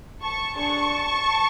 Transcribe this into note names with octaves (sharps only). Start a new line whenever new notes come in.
A5 C#6
D4 G#4 A5 C#6